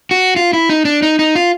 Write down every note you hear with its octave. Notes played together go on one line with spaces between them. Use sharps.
F#4
F4
E4
D#4
D4
D#4
D#4
F4